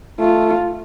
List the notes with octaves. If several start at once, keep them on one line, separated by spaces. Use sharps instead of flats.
A3 F4